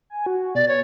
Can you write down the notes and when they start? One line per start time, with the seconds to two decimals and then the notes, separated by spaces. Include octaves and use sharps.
0.10 G#5
0.26 F#4
0.55 B2 D5
0.68 C#5